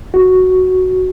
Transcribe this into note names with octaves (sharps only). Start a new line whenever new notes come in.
F#4